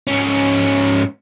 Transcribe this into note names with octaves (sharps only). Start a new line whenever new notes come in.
G#2 C#4